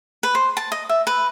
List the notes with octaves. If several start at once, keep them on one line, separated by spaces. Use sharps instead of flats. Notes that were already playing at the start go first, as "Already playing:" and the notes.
B4
C5
A5
D#5
E5
B4